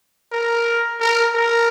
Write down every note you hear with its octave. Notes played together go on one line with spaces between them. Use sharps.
A#4
A#4
A#4